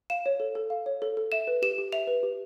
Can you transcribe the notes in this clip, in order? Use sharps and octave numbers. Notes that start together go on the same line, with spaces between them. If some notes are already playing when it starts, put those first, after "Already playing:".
F5 E7
C#5
A4
A4
F5
C#5
A4
A4
E5 E7
B4
G4 E7
G4
E5 F7
B4
G4